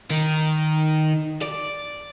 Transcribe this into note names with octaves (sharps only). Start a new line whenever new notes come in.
D#3
D5